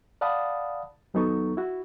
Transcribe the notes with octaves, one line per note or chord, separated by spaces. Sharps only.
D5 F5 F#5 A5 B5 D#6
D#2 F#3 B3 D#4 A4 C#6
E4 F#4